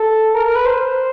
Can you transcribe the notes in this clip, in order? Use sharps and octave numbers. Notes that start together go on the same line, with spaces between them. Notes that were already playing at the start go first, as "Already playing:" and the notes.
Already playing: A4
A#4
A#4
B4
C5